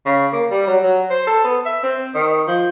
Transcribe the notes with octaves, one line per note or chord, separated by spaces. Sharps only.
C#3
A#3
G3
F#3
F#3
C5
A4
B3
E5
C4
D#3
F3